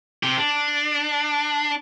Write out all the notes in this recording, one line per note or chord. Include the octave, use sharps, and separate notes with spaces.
C3 G4
D4